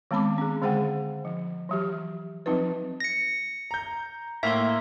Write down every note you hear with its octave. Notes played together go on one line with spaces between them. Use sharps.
D#3 G#3 B3 C4 B5 D6
C#4 G#4
D3 G#3 G#4 C5 F#5 G5
F3
E3 F#3 G4
F3 F#3 C4 D#4 F4 B4
A#6 C#7
A#5 G6
A2 A#3 E5 C6